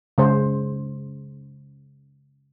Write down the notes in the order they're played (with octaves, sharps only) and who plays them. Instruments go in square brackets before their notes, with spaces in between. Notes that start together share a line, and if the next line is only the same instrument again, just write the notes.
[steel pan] C#3 G#3 C5